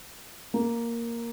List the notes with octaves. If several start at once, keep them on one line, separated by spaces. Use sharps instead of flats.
A#3